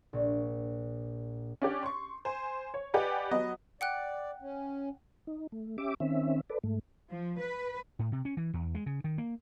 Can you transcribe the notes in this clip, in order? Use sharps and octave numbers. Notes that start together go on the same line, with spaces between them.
A#1
C#4 D4 G4
C6 C#6
C5 G#5
C#5
G4 B4 D5 D#5 F#5 G#5
F#3 B3 D#5
D5 F#5 G5 F#6
C#4
D#4
A3
C#4 G4 E5 D6
D#3 C4 C#4 E5
A4 B4 D5
G#2 A3
F3
B4
A2
C3
C#4
E3
E2
G#3
C#3
D#3
A#3